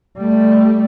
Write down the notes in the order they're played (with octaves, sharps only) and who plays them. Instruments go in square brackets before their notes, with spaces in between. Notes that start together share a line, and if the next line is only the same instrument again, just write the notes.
[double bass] G3 A3